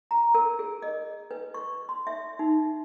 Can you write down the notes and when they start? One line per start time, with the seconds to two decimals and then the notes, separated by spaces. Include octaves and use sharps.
0.11 A#5
0.34 A#4
0.59 G#4
0.82 D#5
1.31 B4
1.54 C#6
1.89 C6
2.07 E5
2.39 D#4